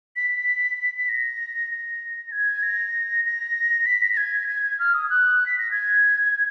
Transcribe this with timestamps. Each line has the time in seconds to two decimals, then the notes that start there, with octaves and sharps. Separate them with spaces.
0.16 B6
0.36 B6
0.78 B6
0.97 B6
1.09 A#6
1.71 A#6
2.32 G#6
2.63 A#6
3.25 A#6
3.86 B6
4.02 A#6
4.13 A#6
4.17 G#6
4.48 G#6
4.64 G#6
4.79 F6
4.94 D#6
5.10 F#6
5.46 B6
5.59 A#6
5.71 G#6